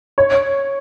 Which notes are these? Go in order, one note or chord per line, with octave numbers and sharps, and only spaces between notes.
C#5